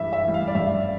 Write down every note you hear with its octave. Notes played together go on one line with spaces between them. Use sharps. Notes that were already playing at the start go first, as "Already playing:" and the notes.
Already playing: G2 E3 G3 E5
E5
E3 G3
F5
D5
G2 E5